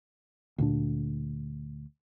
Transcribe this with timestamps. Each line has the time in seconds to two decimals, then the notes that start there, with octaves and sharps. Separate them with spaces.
0.58 D2 A#2 D4